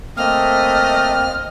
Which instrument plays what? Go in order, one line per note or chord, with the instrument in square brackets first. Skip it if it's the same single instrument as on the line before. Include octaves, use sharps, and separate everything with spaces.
[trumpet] A3 [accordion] A#3 C4 [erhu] D#5 [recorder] F6